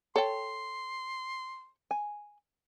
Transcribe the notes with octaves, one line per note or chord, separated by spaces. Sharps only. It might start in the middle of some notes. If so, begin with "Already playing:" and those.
A4 C#5 G5 C6
G#5